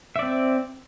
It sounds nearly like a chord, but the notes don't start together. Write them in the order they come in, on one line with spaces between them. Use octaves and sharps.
E5 D5 C4